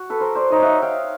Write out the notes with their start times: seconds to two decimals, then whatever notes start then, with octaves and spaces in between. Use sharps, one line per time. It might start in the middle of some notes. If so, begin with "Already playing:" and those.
Already playing: F#4
0.10 A4 B4
0.20 A#4 C5
0.35 C5 D5
0.51 D#4 C#5 D#5
0.62 E5 F#5
0.82 F5 G5